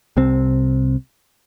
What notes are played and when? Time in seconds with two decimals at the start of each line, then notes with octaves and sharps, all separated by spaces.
0.17 C2 C3 C4